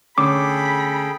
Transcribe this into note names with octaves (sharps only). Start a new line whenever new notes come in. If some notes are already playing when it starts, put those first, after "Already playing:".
D3 A3 C#4 G#4 A4 G5 B5 D6